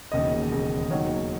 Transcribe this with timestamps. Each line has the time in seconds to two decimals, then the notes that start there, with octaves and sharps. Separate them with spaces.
0.12 E1 D#2 C#3 D#5
0.52 E1 D#2 C#3
0.91 D#2 D#3 F#3 C#5